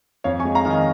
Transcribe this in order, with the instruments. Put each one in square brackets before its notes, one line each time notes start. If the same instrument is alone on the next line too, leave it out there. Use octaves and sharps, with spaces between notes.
[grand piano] F2 C#5 F5
G#5 C#6
G#3
F5 A#5
D#3 F5
D#5 G#5